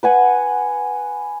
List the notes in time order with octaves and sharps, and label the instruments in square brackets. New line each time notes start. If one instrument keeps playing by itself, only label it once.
[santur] B4 F#5 G#5 D#6